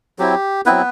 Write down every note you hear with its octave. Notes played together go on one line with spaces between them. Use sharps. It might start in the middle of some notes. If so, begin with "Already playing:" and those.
F#3 C4 E4 G4
F#3 B3 C4 E4 B4